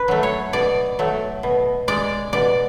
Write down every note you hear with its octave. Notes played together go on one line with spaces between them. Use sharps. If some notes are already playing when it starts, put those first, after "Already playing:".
Already playing: B4
F#3 A3
C#5
B2 D5
F#3 A3
B2
G#3 D5
B2 D5